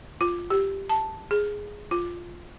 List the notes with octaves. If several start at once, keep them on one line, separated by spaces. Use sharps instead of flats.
F4
G4
A5
G#4
F4